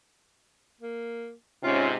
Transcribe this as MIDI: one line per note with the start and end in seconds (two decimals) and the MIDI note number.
0.81 1.32 58
1.64 1.96 44
1.64 1.96 48
1.64 1.87 61
1.64 1.90 65